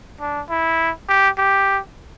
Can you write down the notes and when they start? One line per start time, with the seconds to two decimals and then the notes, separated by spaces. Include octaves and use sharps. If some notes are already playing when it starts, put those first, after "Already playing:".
0.20 D4
0.49 E4
1.09 G4
1.38 G4